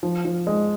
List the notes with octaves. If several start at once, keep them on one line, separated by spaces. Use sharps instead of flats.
F3
F3
G#3